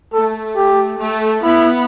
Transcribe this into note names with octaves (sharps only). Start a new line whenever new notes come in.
A3 A4
G4
A3
B3 E4